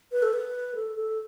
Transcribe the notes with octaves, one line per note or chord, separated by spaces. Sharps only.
B4
A4
B4
A4
A4